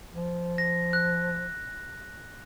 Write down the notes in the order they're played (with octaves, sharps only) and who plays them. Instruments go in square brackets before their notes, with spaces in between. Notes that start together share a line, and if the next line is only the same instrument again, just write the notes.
[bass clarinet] F3
[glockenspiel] A#6
F#6